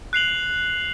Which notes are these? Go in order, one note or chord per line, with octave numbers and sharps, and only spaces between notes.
F#6 C7 F7 F#7